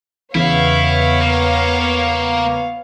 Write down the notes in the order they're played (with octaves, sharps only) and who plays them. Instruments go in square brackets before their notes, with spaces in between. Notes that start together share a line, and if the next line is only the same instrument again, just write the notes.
[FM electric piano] E2 C#3 [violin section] B3 C#5 F5 [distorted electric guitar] E4
[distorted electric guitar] A#3